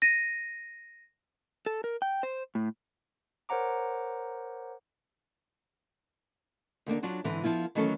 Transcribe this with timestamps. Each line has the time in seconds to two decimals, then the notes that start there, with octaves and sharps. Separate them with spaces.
0.02 A#6 D#7
1.66 A4
1.84 A#4
2.02 G5
2.23 C5
2.55 A2
3.49 A#4 C5 C#5 F#5 A#5 D6
6.86 D#2 D3 A#3 D4
7.03 F#3 D4 F4 F#4
7.24 G#2 D3 E3 C4
7.43 F3 B3 E4 F4
7.75 D#3 E3 F#3 A3 C#4 A4